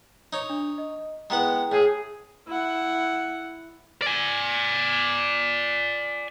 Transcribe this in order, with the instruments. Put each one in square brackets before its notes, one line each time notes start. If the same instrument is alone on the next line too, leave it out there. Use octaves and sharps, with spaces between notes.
[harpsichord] D#4 C#5
[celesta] D4
D#5
[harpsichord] G#3 B3 F#5 [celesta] E4 G5 A#5
[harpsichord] A2 [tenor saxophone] G#4
[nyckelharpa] E4 F#5
[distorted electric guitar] D5 G#5